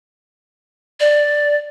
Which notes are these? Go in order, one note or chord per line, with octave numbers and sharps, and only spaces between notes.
D5